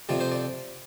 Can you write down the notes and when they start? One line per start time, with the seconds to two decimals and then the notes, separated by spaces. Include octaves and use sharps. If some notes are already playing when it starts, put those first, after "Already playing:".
0.09 F2 C3 F3 D5
0.20 C5
0.32 D5